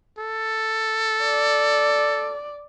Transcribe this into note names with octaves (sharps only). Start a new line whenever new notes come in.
A4
D5